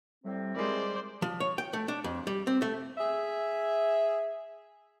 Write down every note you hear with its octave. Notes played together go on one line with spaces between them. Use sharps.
A2 C3 G3 C4
G3 G#3 A#4 C5 D5
F3
C#5
G5
A3
D4
F2
G3
C4
A3
G#4 E5